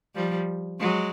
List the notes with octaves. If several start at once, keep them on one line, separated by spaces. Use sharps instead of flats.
F3 G3
F#3 G#3